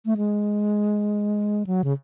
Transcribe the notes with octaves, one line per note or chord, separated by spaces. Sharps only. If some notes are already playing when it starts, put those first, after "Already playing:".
A3
G#3
F#3
C#3